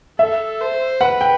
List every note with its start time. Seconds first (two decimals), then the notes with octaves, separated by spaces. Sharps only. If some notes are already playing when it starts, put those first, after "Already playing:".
0.19 A4 E5
0.61 C5
1.01 B4 F#5
1.21 G5